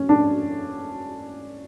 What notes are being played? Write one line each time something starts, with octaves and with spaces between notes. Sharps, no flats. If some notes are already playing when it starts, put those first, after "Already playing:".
Already playing: C#4
D4